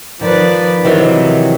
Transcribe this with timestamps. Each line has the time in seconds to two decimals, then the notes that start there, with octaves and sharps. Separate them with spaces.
0.21 D#3 F3 B4 D5
0.85 C3 D#3 E3 F#3